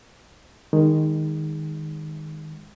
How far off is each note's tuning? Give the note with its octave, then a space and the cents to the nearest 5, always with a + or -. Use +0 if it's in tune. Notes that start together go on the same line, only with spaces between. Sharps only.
D#3 +0 G#3 -15